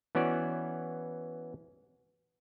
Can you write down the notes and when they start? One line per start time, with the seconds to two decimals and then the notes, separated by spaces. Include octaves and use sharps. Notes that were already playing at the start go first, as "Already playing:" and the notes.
0.15 E3 B3 C#4 F#4 D5